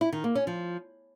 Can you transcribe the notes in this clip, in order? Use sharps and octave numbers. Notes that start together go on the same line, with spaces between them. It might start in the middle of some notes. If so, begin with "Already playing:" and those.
E4
D#3
A#3
C#4
F3